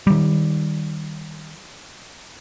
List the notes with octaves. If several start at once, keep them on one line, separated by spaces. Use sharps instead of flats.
D#3 G3